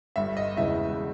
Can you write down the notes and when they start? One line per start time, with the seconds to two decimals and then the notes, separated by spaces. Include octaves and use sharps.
0.16 G1 G2 G3 E5
0.37 D#5
0.57 E1 E2 C#3 E3 E5